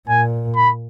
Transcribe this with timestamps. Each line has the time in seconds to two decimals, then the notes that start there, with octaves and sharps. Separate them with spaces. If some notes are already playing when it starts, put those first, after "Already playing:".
0.09 A#2 G#5
0.56 B5